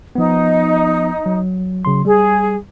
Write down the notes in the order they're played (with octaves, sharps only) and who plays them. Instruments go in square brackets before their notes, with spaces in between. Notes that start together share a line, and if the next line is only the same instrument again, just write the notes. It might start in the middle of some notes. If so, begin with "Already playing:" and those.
[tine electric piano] F3 B3 [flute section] D#4
[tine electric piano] F#3
C#3 F#3 C6
[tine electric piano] G3 [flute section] G#4